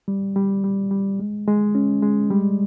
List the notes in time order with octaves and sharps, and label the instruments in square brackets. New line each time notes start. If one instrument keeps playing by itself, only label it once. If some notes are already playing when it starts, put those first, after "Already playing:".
[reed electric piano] G3
G3
G3
G3
G#3
G#3
C#4
G#3
G3